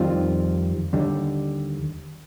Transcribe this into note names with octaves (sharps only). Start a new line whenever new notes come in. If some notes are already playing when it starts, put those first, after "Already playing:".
Already playing: F2 D#3 G3 C4 F4
D#2 D3 G3